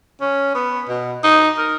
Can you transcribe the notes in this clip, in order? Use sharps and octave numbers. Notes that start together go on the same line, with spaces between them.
C#4
B3
B2
D#4
A#4